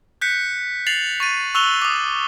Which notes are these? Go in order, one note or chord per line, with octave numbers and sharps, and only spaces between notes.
F#6 G6 B6 C#7
A6 C7 F7 F#7
C#6 A6 D#7
C#6 E6 F#6 F7 G7
D6 D#6